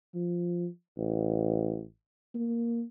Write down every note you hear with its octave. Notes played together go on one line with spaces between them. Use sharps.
F3
A1
A#3